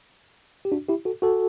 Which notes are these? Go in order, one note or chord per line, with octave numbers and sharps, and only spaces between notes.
G4
D4 F#4
E4 G4
F#4 A4
F#4 A4